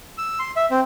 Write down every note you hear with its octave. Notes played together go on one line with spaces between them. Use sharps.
E6
C6
E5
C4